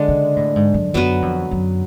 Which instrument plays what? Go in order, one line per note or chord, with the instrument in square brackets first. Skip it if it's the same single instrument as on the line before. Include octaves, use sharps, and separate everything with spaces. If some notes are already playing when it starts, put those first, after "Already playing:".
Already playing: [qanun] D3 G#3 D4
[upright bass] C#3
A2
G#2
F#2
[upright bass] F#2 [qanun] F#3 B3 F#4 B4
[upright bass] F2
F#2